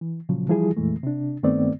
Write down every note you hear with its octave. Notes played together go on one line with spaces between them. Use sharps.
E3
A#2 C#3 F3 F#3
E3 F3 G3 E4 G#4
F2 A#2 E3 G#3 A3
C3 D4
G2 D#3 A3 B3 C4 D5